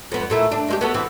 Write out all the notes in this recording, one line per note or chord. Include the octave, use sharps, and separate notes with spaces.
F2 B3
A#2 A3 E4
D4
G#3 C4 G4
B3 F#4 A4
E3 C4